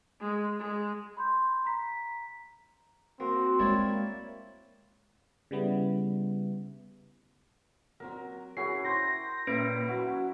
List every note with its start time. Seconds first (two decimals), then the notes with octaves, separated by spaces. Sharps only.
0.20 G#3
0.59 G#3
1.17 B5 C6 G6
1.65 A#5 B6
3.20 A#3 C4 F#4
3.59 G#3 A#3 E4 C#5 D5
5.51 C#3 G3 B3 E4
8.00 F#3 C4 F#4 A#4
8.57 C#4 E4 F#4 G#4 C7
8.84 E4 C5 G5 C6 A#6
9.47 A#2 A#3 C#4 E4 B4 E5 D7
9.88 F#3 F#4